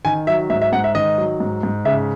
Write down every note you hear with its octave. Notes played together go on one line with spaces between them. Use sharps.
D#3 G#5
F#3 E5
G#2 E5
E5
G#2 F#5
E5
D#3 D#5
F#3
G#2
G#2
C#3 E5